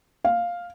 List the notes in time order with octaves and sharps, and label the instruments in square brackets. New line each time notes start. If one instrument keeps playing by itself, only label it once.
[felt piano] F5